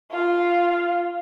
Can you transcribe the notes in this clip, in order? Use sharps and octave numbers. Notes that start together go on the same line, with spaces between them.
F4 F5